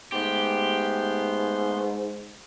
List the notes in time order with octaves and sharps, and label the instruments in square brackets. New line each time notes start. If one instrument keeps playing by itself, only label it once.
[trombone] G#2 [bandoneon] A3 B3 C6 [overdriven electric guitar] G4